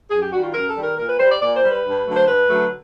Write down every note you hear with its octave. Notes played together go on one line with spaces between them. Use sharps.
F#2 G#4
G4
D#3 G3 F#4
F4
F#2 A#4
A4
D#3 G3
A#4
A#2 A#4
B4
G3 C5
D5
A#2 D5
C5
G3
B4
G2
D3 F#3 A3
C5
G2 B4
D3 F#3 A3